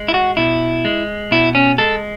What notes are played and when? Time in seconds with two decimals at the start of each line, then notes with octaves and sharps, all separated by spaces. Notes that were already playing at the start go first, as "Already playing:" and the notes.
Already playing: G#3
0.08 E4
0.14 F#4
0.37 B2 E4
0.85 G#3
1.31 B2 E4
1.55 C#4
1.78 G#3 A4